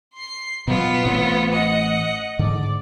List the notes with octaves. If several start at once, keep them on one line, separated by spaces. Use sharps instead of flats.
C6 C7
B2 F#3 B3 F4
A1 A2 C4
D#5 F#5
G#2 D3 D5